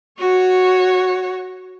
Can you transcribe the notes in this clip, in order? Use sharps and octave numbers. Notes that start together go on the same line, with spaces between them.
F#4 C#5